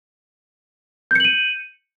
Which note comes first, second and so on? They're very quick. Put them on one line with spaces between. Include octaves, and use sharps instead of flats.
G6 C#7 F#7 D#7